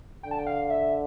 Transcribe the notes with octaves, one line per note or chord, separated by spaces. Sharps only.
D3 G5
A5
G5
F5
E5